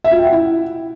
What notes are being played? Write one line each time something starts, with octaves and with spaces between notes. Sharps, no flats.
E5
F4
G5
F#5
E4